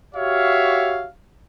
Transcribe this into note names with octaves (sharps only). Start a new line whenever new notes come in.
F#4 G4 C#5 E5 F5